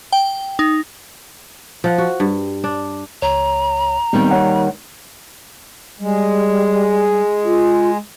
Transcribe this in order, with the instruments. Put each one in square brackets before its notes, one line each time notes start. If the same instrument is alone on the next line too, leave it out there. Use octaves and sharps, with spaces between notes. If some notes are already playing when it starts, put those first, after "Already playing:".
[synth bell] G5
D#4
[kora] F3 F#5
F#4
G2
D4
[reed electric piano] C#2 C#5 [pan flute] A#5
[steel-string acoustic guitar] D#2 D#3 G3 [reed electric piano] B3 C4
[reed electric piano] C#5 F#5
[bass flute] G3 [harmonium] G#3
[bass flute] F4